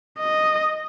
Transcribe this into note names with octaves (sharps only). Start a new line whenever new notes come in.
D#5